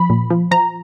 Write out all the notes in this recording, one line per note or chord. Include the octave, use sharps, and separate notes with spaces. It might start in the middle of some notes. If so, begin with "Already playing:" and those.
Already playing: F3 B5
A#2
F3
F3 A#5